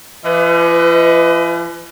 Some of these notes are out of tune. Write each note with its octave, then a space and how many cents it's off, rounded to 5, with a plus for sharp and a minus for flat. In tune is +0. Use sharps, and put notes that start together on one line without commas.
F3 -45 B4 +25 D#5 +30